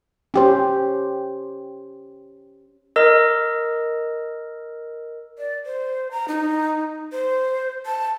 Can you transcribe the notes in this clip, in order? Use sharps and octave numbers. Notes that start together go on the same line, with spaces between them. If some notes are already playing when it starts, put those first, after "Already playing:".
C#4 G4 C5
A#4 D#5 E6
D5
C5
A#5
D#4
C5
A5